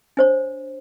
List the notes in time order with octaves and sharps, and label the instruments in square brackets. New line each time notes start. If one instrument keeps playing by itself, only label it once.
[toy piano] D4 C5 C#5